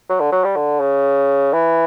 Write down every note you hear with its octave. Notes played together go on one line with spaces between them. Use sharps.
F#3
D3
F#3
G3
D3
C#3
E3